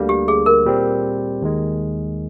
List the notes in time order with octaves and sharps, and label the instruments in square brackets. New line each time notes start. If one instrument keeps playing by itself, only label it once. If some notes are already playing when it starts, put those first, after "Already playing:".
Already playing: [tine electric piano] D2 D3 G3 A#3
[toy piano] G4
G#4
A#4
[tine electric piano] A#2 G3 C4
D#2 D#3 G#3